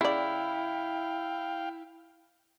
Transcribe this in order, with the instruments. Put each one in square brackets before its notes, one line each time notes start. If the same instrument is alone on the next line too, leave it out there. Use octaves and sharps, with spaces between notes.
[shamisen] C#3 D5 [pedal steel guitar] E4 [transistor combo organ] F5 G5